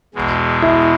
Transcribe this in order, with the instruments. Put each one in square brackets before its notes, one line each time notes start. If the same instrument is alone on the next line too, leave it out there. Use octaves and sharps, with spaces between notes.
[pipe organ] E2 B2 G#3
[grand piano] E4